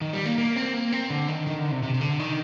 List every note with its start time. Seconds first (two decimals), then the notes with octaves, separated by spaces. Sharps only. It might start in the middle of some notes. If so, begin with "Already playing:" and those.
0.01 D#3
0.13 G3
0.26 A#3
0.38 A#3
0.56 C4
0.74 A#3
0.92 C4
1.10 D3
1.28 D#3
1.47 D#3
1.59 D3
1.71 C3
1.83 C3
1.94 C3
2.01 D3
2.19 D#3